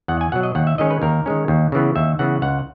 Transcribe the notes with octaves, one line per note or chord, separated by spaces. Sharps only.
E2 F#5
G#5
B2 F#3 F#5
D#5
D#2 F#5
E5
D#3 G#3 C#4 D#5
B4
D#2 A#4
D#3 G#3 C#4
D#2
C#3 E3 B3
D#2 E5
C#3 E3 B3 F#5
C#2 F#5